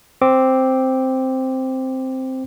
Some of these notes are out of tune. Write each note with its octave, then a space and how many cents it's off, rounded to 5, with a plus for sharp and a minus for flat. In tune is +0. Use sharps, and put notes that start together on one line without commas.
C4 +0 D6 +0